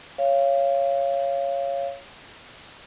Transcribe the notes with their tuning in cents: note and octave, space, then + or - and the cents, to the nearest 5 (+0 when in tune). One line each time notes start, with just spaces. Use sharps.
C#5 +0 F5 -20